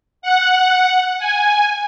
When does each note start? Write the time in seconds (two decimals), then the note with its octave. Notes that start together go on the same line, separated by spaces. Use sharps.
0.22 F#5
1.19 G#5